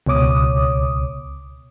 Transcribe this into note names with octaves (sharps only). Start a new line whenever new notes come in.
C#2 B2 C#5 D6 D#6